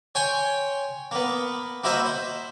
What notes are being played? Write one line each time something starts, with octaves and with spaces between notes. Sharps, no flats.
C#5 G5 G#5 C6
A#3 B3
A#3 E4 F#4 C5 D#5 E5
C5